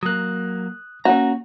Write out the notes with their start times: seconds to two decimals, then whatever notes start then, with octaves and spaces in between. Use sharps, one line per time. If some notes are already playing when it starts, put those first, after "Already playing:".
0.03 F#3 A#3 D#6 F#6
1.05 A#3 C#4 F#4 A#5